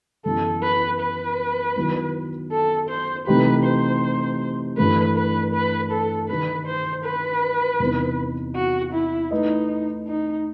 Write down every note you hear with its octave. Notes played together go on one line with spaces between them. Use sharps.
F#2 E3 G3 B3 E4 A4
B4
B4
D#3 F#3 B3 E4
A4
C5
C3 E3 A3 D#4 G4 B4
C5
G2 E3 A3 B4
B4
B4
A4
D#3 G3 D#4 B4
C5
B4
E2 C3 E3 B3 D#4
F#4
E4
A3 D#4 E4 B4 D#5
D#4